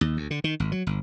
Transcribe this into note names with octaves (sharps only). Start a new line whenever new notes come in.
D#2
D2
D3
D#3
G#1
F#3
G1